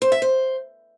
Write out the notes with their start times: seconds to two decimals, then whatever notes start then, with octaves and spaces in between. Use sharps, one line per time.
0.02 C5
0.12 E5
0.22 C5